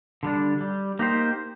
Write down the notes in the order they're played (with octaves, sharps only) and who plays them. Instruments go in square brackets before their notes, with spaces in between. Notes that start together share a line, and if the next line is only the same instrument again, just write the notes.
[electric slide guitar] D3 G3 D4
G3
A#3 D#4 G4 C5